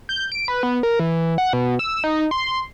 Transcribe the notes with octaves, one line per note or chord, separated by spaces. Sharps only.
G6
D7
B4
B3
A#4
E3
F#5
B2
E6
D#4
C6